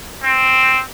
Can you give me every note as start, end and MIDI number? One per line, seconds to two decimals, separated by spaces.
0.23 0.81 60